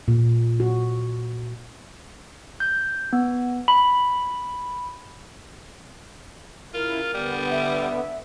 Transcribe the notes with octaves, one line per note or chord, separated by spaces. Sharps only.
A#2
F#4
G6
B3
B5
C#3 E4 F4 A#4
D3 G3 B3
E5